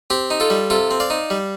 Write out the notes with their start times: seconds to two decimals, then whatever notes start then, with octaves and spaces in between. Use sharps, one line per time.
0.10 C4 G4
0.30 D#4
0.40 F4 A4
0.50 G3
0.70 C3 F4 A4
0.91 C4
1.00 D5 F5
1.10 D#4
1.30 G3